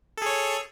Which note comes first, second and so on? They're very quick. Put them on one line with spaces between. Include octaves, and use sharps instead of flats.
A4 G#4 C#5